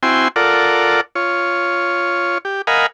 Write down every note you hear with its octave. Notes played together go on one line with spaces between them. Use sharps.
C4 E4 F#4 G5 G#5 C6
F4 A4 A#4 D5 F#5
F4 C#5
G4
A#4 D#5 F5 F#5 G#5 B5